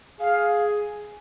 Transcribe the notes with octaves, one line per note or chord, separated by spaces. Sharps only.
G#4 F5